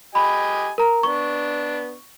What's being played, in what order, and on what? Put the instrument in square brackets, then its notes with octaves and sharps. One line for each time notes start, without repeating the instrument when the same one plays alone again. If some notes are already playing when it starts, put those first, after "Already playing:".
[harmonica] G4 D#5 G#5 [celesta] B5
[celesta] A#4 A#5
[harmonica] B3 D4 [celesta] C#6